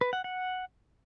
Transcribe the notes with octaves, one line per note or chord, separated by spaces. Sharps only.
B4
F#5
F#5